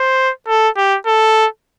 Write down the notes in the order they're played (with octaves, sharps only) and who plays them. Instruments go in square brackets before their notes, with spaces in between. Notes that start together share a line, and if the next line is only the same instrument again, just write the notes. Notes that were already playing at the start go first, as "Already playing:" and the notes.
Already playing: [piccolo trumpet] C5
A4
G4
A4